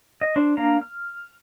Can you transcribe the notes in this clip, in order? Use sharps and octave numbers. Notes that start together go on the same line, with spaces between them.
D#5
D4 C5
A#3 D4 F5 A#5
F6